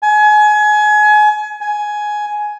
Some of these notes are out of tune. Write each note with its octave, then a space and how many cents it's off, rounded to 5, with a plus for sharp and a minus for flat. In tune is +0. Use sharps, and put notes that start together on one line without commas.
G#5 +30
G#5 +10